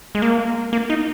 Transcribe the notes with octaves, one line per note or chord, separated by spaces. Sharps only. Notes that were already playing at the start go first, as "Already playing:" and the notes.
G#3
A#3
A#3
D#4